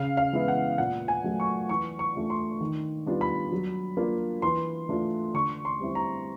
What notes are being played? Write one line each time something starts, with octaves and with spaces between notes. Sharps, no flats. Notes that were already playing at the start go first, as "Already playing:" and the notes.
Already playing: C#3 F5
F5
E3 G#3 B3 E4
F#5
A#2 F#5
G#5
F#3 A3
C#6
E3 C#6
C#6
A3 D4 F4
C6
D#3
G3 B3 D4 F4
B5
F#3
A#3 D4 F4
E3 C6
A3 D4 F4
D3 C#6
C6
G3 C4 E4
A#5